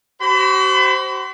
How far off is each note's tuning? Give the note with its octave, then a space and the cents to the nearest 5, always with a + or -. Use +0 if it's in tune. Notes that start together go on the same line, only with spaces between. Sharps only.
F#4 +45 C5 +0 B5 +35